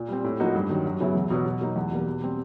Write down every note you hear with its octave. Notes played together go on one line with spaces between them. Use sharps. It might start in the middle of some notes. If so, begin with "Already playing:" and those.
Already playing: A#2
G3 C4
A2
F3 A#3 D#4 F#4
G2
D#3 F#3
F#2
C#3 F#3 B3 E4
E2
B2 F#3 B3
B2
F#3 A#3 D#4
E2
B2 G3 A#3
B2
G3 C4